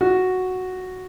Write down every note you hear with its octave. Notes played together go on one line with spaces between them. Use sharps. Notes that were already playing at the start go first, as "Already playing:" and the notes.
F#4